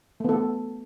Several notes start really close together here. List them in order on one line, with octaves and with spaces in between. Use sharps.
A3 B3 A4